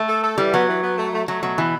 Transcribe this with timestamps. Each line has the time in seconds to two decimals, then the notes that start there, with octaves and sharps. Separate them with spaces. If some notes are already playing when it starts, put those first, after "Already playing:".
Already playing: A3
0.09 A4
0.24 A4
0.38 E3 G3
0.53 F#3 B3
0.69 E3
0.83 B3
0.97 A3
1.14 A3
1.28 F#3 A3
1.43 B2 F#3
1.58 B2 E3